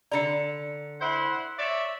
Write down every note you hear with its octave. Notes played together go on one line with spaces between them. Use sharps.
D3 D5 A#5 C#7
E4 C5 F#5
C#5 D5 E5